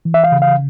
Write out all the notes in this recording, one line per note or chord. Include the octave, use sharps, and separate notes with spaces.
E3
E5
F5
C#3
F5